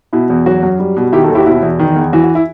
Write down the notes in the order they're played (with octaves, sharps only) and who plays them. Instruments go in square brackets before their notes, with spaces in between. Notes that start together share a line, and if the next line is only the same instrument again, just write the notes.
[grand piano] B2 E4
E2
F#3 F#4
F#2
G3
B2
D#3 E4 G4
F#4 A4
D#2
E4 G4
F#4
B2 E4
E2
D#3
E2
E3 F#4
F#4
E4